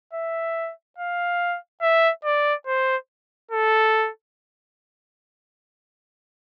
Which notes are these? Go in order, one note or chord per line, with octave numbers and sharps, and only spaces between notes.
E5
F5
E5
D5
C5
A4